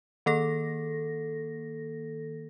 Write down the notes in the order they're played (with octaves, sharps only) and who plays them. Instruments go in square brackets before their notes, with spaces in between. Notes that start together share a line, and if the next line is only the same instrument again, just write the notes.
[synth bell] D#3 A#3 A4 A#6